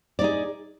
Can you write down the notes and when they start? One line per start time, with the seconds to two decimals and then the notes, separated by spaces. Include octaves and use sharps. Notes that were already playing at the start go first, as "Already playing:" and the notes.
0.19 D5
0.21 D#4
0.24 G#4